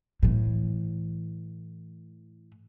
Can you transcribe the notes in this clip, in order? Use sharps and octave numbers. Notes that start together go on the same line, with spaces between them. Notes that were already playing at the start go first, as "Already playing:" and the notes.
A2 E3